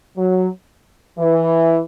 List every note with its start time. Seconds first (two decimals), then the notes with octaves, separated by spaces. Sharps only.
0.17 F#3
1.18 E3